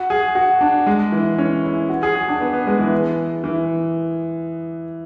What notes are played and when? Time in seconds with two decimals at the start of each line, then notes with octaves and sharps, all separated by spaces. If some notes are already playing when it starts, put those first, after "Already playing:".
Already playing: F#4
0.10 G#4
0.35 F#4
0.61 D4
0.87 G#3
1.12 E3
1.38 C#4
1.64 E4
1.89 F#4
2.03 G#4
2.15 F#4
2.28 D4
2.40 B3
2.53 B3
2.67 G#3
2.79 E3
3.44 E3